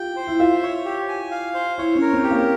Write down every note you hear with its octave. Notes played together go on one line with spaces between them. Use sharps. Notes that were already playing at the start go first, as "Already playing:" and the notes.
Already playing: F4 G4 G5
C5
E4
F4 E5
C#5
G4
G#5
F5
C5
E4 C#5
C#4
A#4
C4
G4
A#3